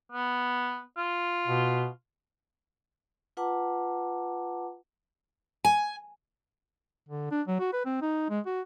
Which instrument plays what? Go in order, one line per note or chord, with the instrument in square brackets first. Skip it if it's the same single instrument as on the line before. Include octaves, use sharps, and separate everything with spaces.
[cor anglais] B3
F4
[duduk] B2
[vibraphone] F4 B4 F#5 A5 A#5 D6
[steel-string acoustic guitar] G#5
[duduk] D3
D4
F#3
F#4
B4
C4
D#4
G#3
F#4